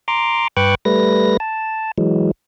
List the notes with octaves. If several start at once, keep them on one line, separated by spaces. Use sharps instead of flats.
A#5 C6 D6
G2 B4 G5 C#6 D6 F#6
G3 A3 B4 A#6
A5
E3 F#3 G#3